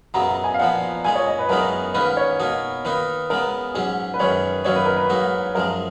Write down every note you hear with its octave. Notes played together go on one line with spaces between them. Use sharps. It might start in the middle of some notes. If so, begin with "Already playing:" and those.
F#2 C#3 F#3 B3 A#5
A#5
G#5
F5
A#2 F3 B3 F#5
A#2 G#3 D#4 G#5
C#5
D#5
B4
F#2 C#3 G#3 B3 D#4 A#4
G#2 D#3 A#3 C#4 B4
C#5
B2 A#3 D#4
D#3 A#3 D#4 B4
C#3 G#3 B3 A#4
G#2 F#3 C#4 G#4
B4
F#2 D#3 G#3 C#5
F#2 D#3 F#3 A#3 C#5
B4
A#4
B4
G#2 F#3 A#3 D#4
F#2 F3 G#3 A#4